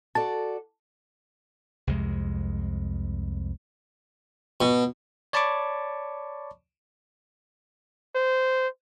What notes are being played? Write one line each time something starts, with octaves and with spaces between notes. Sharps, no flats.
F#4 A4 D5 A5
C2 F2 G#3
B2
C#5 D5 A5 B5 C#6 D6
C5